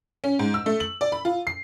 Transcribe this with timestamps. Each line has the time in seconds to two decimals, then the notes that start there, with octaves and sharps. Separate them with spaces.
0.24 C#4
0.39 G#2
0.54 E6
0.66 A3
0.80 F#7
1.01 D5
1.12 B5
1.25 F4
1.47 C7